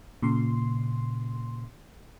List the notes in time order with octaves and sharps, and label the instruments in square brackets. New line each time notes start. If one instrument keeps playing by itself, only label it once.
[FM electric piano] A#2 C#3 C6